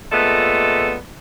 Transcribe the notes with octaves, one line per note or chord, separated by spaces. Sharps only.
A#2 G#3 A3 B3 A4